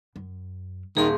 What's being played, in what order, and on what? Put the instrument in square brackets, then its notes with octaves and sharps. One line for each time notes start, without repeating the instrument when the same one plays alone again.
[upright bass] F#2
[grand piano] D#1 [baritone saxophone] D#3 [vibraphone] G#4 C6